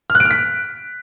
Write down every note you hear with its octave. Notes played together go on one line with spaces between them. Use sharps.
F6
F#6
D7
F6
B6